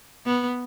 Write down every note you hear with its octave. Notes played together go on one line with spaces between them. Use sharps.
B3